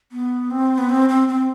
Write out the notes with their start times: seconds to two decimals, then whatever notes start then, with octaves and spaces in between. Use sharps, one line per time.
0.12 B3
0.51 C4
0.78 B3
0.89 C4
1.09 C4
1.28 C4